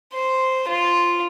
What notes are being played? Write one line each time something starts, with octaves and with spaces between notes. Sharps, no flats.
C5
F4